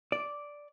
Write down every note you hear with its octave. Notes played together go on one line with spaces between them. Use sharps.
D5